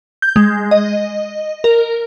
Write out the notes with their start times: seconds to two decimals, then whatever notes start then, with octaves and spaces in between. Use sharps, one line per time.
0.22 G6
0.36 G#3
0.71 D#5
1.64 A#4